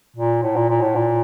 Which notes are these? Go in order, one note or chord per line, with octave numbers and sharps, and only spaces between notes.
A#2
A2
A#2
A#2
A2
A#2